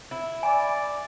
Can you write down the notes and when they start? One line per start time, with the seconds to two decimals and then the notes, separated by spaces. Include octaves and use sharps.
0.11 E4
0.43 D5 G#5